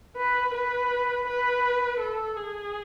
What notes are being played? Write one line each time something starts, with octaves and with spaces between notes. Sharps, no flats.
B4
B4
B4
A4
G#4